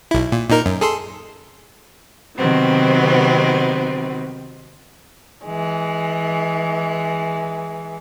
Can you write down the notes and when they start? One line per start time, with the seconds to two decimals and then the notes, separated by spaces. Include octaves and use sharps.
0.11 B1 E4
0.32 A#2
0.50 A#2 D#4 A#4
0.66 F#2
0.81 G#4 A4 C6
2.37 C3 D#3 F#3 B3 C4
5.45 E3 G#3